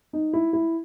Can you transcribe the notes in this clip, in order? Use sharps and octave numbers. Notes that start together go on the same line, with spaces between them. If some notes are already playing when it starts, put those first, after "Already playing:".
D#4
E4
E4